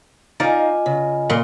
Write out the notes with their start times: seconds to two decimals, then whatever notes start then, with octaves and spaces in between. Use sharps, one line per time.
0.40 D#4 F4 D5 D#5 F5 G#5 A#5
0.86 C#3
1.30 A#2 C6